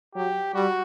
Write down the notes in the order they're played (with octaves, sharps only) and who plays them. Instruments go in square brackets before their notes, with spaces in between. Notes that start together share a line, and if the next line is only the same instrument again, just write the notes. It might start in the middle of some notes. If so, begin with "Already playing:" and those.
[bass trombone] F#3 [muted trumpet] G4
[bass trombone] G3 [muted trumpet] F#4